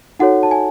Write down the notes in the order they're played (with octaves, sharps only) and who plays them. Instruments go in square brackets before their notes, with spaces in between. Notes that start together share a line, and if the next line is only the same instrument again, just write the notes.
[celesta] D#4 F#4 A4 C#5 F#5
A5
G#5